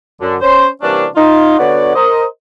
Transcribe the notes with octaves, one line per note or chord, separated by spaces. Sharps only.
F#2 D3
C#4 C5
C3 E3 G3 A#3 C#4 D4
D#4 F4
D3 B3 F#4 C#5 D5
A#4 C5 D#5